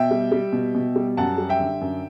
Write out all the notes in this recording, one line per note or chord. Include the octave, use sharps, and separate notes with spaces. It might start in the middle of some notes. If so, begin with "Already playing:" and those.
Already playing: B2 E5 G5
G3
G3
B2
B2
G3
F#2 F#5 A5
G3
E5 G5
D3
F#2